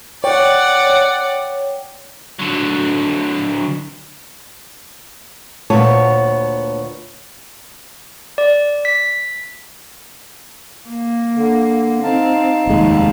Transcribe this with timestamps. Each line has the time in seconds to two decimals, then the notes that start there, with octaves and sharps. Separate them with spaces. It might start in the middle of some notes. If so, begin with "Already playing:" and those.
0.24 C#5 D5 F#5 G5
2.39 D3 F#3
5.70 D2 A#2 B3 C#5 A5
8.38 D5
8.85 B6
10.89 A#3
11.36 D3
12.03 C4 D#4 F5 A5
12.67 F1 D#2 G#3